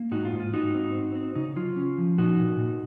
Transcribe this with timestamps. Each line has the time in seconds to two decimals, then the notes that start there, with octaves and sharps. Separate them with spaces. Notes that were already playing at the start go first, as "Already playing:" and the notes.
Already playing: A#3
0.11 G#2 D#4 F#4
0.25 F4
0.32 G#2
0.40 F4
0.53 G#2 D#4 F#4
0.74 C4
0.95 C4
1.15 C4
1.35 C#3 D#4
1.56 F#3 F4
1.76 C#4
1.98 F3
2.18 A#2 D#4 F#4
2.38 A#2
2.60 A#2